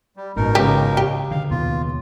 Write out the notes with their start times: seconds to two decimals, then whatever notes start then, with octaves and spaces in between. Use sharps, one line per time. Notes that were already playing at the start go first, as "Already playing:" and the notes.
0.16 G3
0.37 A1 G#2 B2 D#4 A#4
0.55 C#2 G4
0.97 G4
1.31 D3 F5
1.51 D#2 B2 F4